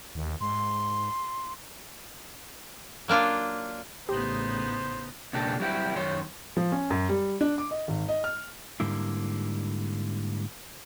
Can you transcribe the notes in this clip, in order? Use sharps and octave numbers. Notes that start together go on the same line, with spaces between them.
D#2
G#2 C6
F#3 A#3 D4 F4
A1 A2 C#3 B3 D#4 G4 C5
C#2 B2 A#3 D4 G4 A4
F#3 G3 C4 E4 F#4 G4
F#2 D#3 C#5 C6
F3
C#4
F#2
G3
D4
D6
D#5
G#1
D#5
F6
G#2 D3 G3 A#3 E4